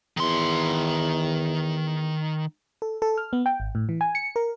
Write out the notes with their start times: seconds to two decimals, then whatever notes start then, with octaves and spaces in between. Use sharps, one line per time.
0.17 E2 D#3 C6
2.82 A4
3.02 A4
3.18 F6
3.33 B3
3.46 G5
3.60 G#1
3.75 A2
3.89 E3
4.01 G#5
4.15 C#7
4.36 A#4